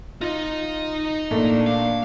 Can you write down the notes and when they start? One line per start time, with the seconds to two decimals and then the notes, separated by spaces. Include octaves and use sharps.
0.21 D#4 F4 D#5
1.31 A#2 A3 A#3 D4
1.66 F5